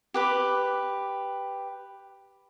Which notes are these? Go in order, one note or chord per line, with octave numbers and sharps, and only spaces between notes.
G4 B4 D6